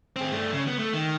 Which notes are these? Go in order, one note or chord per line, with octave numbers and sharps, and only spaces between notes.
C4 G#4
G2 A3
C#3
B3
A3
D#3